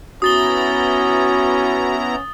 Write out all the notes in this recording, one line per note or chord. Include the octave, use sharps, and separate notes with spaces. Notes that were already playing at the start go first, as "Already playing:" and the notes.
B3 C#4 E4 F#4 A#5 D#6 A6 G7